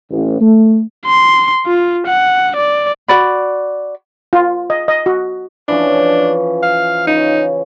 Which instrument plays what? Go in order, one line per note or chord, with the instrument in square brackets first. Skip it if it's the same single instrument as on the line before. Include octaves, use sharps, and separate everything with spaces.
[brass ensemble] A1
A3
[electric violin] C6
F4
F#5
D5
[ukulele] F#4 D5 B5
[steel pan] F4
D#5
D#5
F#4
[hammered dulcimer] E3 F3 C#4 [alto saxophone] D4
[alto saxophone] F5
[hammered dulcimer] C#3 [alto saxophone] D#4